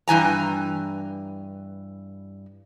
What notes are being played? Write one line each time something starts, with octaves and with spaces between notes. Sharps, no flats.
G2 E3 G#5 A#5